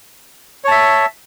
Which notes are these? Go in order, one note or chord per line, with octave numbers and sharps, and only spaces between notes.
C#5 E5 A5